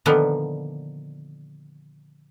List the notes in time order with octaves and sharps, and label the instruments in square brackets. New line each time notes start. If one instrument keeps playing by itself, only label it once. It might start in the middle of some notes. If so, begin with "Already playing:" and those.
[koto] A#2 D3 D#3 F3 B3